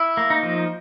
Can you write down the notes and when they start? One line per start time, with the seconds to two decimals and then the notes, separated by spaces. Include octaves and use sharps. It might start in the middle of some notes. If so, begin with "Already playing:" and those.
Already playing: E4
0.17 A#3
0.30 D#4
0.43 F3